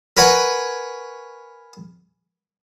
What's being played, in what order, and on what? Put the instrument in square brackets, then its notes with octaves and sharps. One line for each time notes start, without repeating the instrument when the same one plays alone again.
[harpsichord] A#4 B4 C#5 F#5 G#5